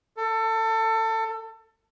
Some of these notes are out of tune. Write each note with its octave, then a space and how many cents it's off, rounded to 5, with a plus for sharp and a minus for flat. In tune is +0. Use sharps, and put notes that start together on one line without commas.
A4 +25